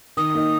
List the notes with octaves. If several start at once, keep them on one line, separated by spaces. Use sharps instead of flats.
D#3 D#6
A#3 D#4